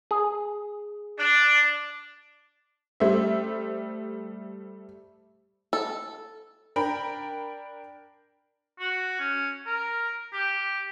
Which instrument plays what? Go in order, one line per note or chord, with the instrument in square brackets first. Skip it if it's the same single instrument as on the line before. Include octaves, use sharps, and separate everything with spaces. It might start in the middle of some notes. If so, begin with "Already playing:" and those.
[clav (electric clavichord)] G#4
[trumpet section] D4
[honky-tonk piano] G3 A3 C5 E5
[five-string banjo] A4
[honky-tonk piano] D4 A#4 G5 B5
[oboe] F#4
C#4
A#4
G4